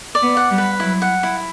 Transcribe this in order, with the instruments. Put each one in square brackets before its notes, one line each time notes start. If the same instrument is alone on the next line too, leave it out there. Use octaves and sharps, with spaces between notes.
[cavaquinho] D5
[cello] B3
[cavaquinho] F#5
[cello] G3
[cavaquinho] B4
[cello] F#3 [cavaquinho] E4
[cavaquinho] F#5
E4